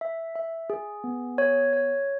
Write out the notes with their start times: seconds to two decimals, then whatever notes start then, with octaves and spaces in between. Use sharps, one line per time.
0.01 E5
0.35 E5
0.70 G#4
1.04 B3
1.38 C#5
1.73 C#5